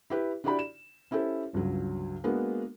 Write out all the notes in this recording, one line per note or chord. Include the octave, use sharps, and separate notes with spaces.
E4 G4 B4
D4 E4 F#4 G4 D5 B5
E7
C#4 E4 G4 A4 C5
G1 C#2 G2 F#3
G#3 A#3 B3 D4 F#4